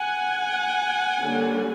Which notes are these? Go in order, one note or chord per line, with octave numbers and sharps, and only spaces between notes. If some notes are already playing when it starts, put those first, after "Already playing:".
Already playing: F#5 G#5
D3 G3 A#3 C#4